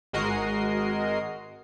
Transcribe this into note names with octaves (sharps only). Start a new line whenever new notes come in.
G#1 G#3 F#4 A#4 D#5 C7